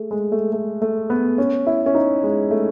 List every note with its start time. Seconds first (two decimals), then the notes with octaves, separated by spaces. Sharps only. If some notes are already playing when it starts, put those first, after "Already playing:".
Already playing: A3 G#4
0.11 G#3
0.32 A3
0.53 A3
0.82 A3
1.10 B3
1.38 C#4
1.67 E4
1.86 C#4
1.95 D#4
2.23 G#3
2.51 A3